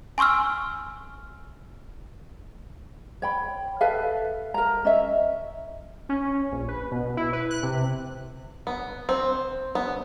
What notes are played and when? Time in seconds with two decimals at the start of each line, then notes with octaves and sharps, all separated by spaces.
0.18 G#5 C6 C#6 E6 F6
3.22 C#5 G5 B5
3.81 A4 B4 E5 F5
4.54 A#4 A#5
4.85 C#4 D#5 E5
6.09 C#4
6.52 A#1
6.68 B4
6.91 B2
7.17 E4
7.33 B4
7.50 F#6
7.63 C3
8.67 B3
9.09 C4
9.75 B3